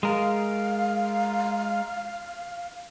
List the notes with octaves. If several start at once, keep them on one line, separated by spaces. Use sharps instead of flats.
G#3 A#4 F5